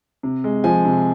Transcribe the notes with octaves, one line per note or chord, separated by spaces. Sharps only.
C3
G#3
F3 G#5
C3